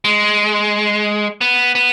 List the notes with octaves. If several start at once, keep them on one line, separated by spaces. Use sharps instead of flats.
G#3
B3
B3